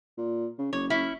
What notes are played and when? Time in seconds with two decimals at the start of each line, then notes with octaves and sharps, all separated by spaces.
0.18 A#2
0.58 C#3
0.73 F#1 C#5
0.90 C#4 E4